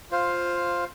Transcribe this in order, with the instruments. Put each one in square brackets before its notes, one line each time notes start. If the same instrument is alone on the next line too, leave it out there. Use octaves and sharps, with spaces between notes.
[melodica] F4 C5 F5